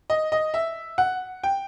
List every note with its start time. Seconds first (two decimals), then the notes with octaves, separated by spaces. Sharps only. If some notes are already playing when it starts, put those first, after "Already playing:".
0.10 D#5
0.32 D#5
0.54 E5
0.98 F#5
1.44 G5